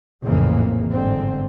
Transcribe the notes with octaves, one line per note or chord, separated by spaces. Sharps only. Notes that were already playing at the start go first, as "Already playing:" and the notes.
A#1 F2 A2 C#3 E3 A#3
G1 G#2 D3 C4